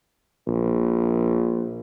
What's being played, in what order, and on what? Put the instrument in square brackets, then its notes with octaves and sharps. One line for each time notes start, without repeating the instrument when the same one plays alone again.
[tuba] A#1